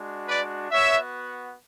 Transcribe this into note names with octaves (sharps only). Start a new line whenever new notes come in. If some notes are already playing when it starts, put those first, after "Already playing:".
Already playing: G#3 D4 F#4
B4 D5
B3 F#4 C#5 E5